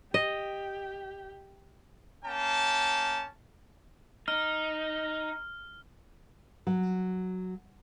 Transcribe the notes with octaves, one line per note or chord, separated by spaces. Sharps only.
G4 D#5
A#3 C#4 G5 A5
D#4 F6
F#3